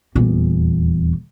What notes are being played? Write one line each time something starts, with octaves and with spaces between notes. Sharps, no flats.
D#1 E2